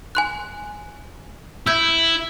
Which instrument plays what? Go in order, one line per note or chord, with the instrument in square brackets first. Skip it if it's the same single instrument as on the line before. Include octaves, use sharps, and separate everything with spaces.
[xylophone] G#5 C6 F#6
[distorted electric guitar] E4 [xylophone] E6 G6 G#6